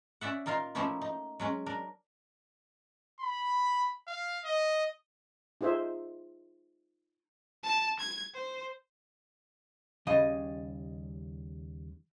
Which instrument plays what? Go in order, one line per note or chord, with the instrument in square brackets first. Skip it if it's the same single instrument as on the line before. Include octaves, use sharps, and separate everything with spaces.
[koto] C#4 D5 E5 F#5
A#2 D#4 F4 A#4 F5
F3 A3 A#3 C#4 D#4 E4
D#4
F#3 G#3 C#4
D4 A#4
[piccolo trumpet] B5
F5
D#5
[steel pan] D#4 F4 G#4 C5 E5
[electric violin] A5
G#6
C5
[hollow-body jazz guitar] D#2 C#3 G3 D#5